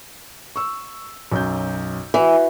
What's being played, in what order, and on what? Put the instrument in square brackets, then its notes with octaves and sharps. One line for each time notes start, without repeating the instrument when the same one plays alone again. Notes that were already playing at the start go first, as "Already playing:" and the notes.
[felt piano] C#6 E6
B1 F#2 G6
[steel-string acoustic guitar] E3 [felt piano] F#4 B4